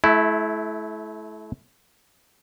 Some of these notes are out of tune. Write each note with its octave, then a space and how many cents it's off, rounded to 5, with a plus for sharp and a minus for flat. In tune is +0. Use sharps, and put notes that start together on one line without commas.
A3 -35 E4 +0